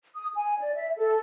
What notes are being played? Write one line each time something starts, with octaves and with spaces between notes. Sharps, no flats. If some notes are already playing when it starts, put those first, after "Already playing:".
D#6
G#5
D5
E5
A4